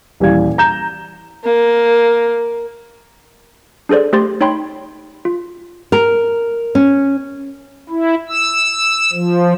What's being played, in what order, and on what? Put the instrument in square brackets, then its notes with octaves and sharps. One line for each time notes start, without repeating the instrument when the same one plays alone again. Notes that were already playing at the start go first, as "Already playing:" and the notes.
[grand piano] D#1 E3 G3 F5 G#6
A#5 G6 E7
[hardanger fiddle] A#3
[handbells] D4 G#4 A4 C5 D5
A3 G4 C5 C6 A6
D#4 C#5 G5 B5 C6
F4
[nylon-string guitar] A#4
C#4
[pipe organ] E4
E6
F3